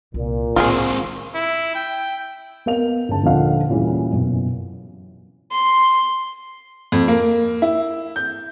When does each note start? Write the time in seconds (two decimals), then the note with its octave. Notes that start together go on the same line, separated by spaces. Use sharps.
0.14 C2 A#2
0.56 A2 D#3 G#3 C4 F4 G4 G#4
1.34 E4
1.75 G5
2.66 B3 A#4 F5 F7
3.09 G1 C#3 A5
3.23 D#1 D3 F3 F4 F5 F#5
3.70 A#2 C#3 E3 G3
4.12 F#2 B2
5.51 C6
6.92 F2
7.08 A#3
7.62 E4
8.16 G6